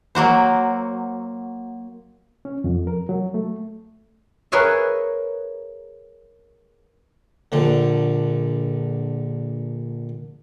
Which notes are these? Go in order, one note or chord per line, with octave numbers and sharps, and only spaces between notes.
F#3 A#3 F#4 C5
C#4
F2
A#4
F#3
A3
G#4 A#4 B4 C#5 D#5 E5
A#1 D3